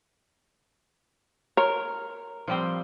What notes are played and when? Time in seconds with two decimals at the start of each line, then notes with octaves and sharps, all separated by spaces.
1.57 A#4 C#5
2.47 F3 G3 C4